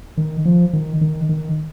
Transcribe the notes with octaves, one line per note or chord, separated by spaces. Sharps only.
D#3
F3
D#3
D#3
D#3